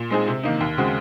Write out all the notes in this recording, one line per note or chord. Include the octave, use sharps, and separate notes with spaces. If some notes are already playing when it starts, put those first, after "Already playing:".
Already playing: A#2
G#3 C4 D#4 G#4
C3
D#3 A#3 D#4
D#2
C#3 G#3 C4 F#4